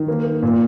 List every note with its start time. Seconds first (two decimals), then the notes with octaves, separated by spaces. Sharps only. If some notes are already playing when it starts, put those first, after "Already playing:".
Already playing: D#3
0.08 A#3
0.25 A#3
0.43 A#2